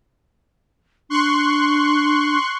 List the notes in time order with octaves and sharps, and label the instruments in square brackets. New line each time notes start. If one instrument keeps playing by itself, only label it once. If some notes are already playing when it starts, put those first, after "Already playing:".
[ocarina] D4 [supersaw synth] C6 C#6 F#6